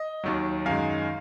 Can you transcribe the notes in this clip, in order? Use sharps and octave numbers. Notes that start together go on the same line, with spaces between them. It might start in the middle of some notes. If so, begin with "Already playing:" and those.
Already playing: D#5
D#2 D#3 F#3
F#2 D#3 G#3 F5